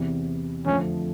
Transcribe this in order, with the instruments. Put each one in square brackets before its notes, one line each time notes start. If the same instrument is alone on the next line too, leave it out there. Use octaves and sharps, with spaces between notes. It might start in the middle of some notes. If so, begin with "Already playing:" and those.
Already playing: [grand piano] E2 C3 E3
[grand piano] F2 D3 F3 A3 C4 [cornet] C#4